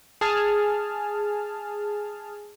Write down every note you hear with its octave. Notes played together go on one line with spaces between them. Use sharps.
G#4 A5 F6